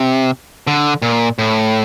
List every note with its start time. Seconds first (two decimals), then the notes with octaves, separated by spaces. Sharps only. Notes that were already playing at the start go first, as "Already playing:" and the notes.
Already playing: C3
0.67 D3
1.02 A#2
1.38 A2